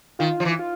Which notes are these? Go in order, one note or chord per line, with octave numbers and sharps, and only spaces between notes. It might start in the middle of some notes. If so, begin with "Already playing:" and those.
D#3 F4
F3
E3
F4